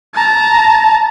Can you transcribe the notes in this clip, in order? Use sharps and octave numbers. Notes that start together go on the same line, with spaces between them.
A5 A#5